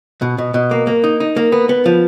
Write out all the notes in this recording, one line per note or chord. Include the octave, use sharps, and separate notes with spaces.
B2
B2
B2
A#3
A#3
D#4
D#4
A#3
B3
B3
F3